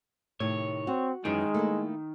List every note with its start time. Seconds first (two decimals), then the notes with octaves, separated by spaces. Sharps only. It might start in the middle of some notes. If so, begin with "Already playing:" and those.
0.40 A2 C3 D#3 C#5
0.87 C4 F#4
1.25 F#2 D#3 E3 G#3
1.54 A3 A#3 E4